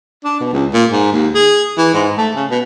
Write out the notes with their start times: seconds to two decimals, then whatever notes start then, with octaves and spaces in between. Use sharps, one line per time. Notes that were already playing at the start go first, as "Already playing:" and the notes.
0.24 D4
0.40 B2
0.53 C#2
0.73 A#2
0.92 G#2
1.12 D#2
1.35 G#4
1.78 E3
1.94 G#2
2.18 A3
2.35 C#3
2.50 B2